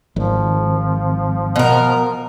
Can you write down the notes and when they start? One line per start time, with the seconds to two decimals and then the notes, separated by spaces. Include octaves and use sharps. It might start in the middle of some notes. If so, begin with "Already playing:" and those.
0.16 G#1 F3
1.56 B2 A#4